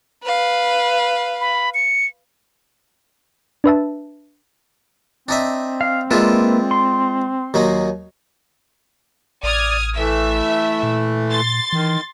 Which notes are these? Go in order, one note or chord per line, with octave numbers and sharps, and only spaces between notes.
B4 F5
B5
C#7
D4 B4 E5 A5
C4 D4 D#4 E5
F5
G#3 A#3 D4 F4 B4 E5
C6
D#2 F#3 D#4
A1 D5 D#6 F6 G#6
E3 A3 E5
A#2
C6 A6
D#3 E3